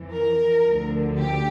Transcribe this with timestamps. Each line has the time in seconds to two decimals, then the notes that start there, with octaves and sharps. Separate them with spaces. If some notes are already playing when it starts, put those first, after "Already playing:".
Already playing: F2 E3
0.13 A#4
0.65 D2 D3 F3
1.19 G4